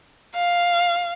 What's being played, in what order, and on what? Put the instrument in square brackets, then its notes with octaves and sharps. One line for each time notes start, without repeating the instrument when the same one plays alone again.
[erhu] F5